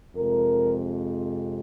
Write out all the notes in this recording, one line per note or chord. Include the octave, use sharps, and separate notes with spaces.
F2 C3 F3 G#3 A#4